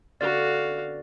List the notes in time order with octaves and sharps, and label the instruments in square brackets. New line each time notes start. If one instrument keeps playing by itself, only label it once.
[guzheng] D3 B3 C#4 [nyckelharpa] F#4 F5 [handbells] D5